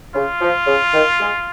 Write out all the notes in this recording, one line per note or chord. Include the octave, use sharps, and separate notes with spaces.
C#3 F4
F3
C#3
D#3
G#3